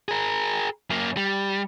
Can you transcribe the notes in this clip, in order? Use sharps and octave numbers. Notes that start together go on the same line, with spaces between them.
G#4 A#4
F#2 A#3
G3